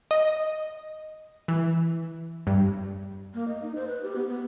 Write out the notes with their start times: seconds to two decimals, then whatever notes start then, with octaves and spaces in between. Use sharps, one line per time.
0.11 D#5
1.48 E3
2.47 G2
3.34 A#3
3.48 D#5
3.62 D#4
3.75 C5
3.88 B4
4.03 G4
4.16 B3
4.29 B3